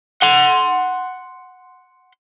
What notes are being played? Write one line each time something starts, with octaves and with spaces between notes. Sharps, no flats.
F#5 C6